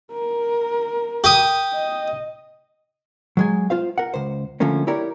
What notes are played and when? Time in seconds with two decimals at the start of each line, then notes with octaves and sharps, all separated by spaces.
0.12 A#4
1.24 G4 D#6
1.74 D#5
3.37 F#3 G#3 G#5
3.70 F4 C5 F5
3.98 A#4 F#5
4.14 C#2 C5
4.60 D3 F3 A3 A#3 C#4
4.87 E4 G4 A#4 C#5 D5